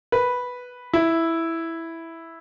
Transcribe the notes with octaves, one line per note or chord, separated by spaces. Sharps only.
B4
E4